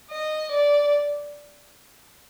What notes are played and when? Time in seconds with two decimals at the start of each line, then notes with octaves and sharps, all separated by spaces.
0.11 D#5
0.52 D5